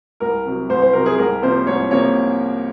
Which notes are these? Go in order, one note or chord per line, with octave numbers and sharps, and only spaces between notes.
C2 A#4
C3 F#3
C2 C5
C5
C3 F#3 A#4
G#4
C2 A#4
C3 F3 A#3 C#4 C5
C2 C#5
C3 F3 A#3 C#4 C#5